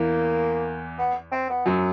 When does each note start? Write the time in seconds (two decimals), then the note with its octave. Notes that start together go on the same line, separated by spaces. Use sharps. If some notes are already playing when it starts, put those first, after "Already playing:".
Already playing: E2 E3 A#3
0.99 B3
1.32 C4
1.50 B3
1.66 F#2 F#3